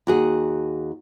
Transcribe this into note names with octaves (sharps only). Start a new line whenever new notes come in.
D#2 F#4 G#4